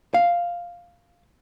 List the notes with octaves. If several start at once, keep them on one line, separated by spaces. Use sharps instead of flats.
F5